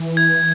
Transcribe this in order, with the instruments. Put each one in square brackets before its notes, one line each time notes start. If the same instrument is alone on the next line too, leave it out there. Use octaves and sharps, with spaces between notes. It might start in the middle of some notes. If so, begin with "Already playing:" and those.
Already playing: [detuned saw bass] E3
[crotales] G#6